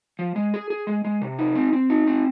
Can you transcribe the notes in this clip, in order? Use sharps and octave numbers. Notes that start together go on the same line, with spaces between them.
F3
G#3
G#4
G#4
G#3
G#3
C3
D#4
C4
C4
D#4
C4